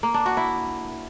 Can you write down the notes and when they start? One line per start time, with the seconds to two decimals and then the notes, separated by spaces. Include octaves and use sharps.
0.03 A#3
0.14 D4
0.26 F#4
0.37 E4